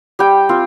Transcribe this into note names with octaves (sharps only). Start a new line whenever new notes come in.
G3 G5
C4 F4